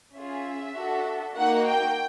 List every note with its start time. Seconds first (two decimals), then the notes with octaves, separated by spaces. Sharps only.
0.15 C#4 F4 G#4 E5
0.76 D4 F#4 A4
1.37 A#3 D#4 F#4 F#5
1.67 G5